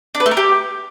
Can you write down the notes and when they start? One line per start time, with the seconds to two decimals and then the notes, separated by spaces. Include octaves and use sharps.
0.15 D4
0.20 B4
0.26 A3
0.31 A#4
0.37 G4